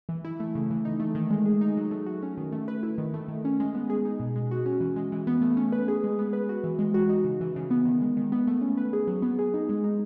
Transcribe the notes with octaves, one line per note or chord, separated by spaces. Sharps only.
E3
E4
A3
C#3
E3
D#4
A3
D#3
G#3
G#4
D#4
F#3
A3
F#4
C#4
D#3
A3
B4
E4
D#3
A3
D#3
C#4
G#3
B3
G#4
D#4
B2
G#3
F#4
C#4
E3
G#3
E3
B3
A3
C#4
B4
G#4
G#3
B3
B4
F#4
E3
G#3
F#4
D#4
C#3
E3
C#3
B3
D#3
G#3
D#3
B3
A3
C#4
B4
G#4
F#3
B3
G#4
D#4
G#3
D#4